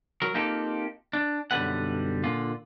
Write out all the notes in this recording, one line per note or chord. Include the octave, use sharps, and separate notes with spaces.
F#3 A#4
A#3 C4 D#4 F4 G4 A4
D4
B1 F#2 D3 G3 B4 F#5
A#2 D3 F4